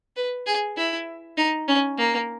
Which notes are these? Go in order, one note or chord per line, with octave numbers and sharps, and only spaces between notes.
B4
G#4
E4
D#4
C#4
A#3